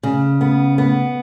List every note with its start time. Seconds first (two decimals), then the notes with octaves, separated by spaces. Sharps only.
0.03 C#3
0.41 B3
0.78 B3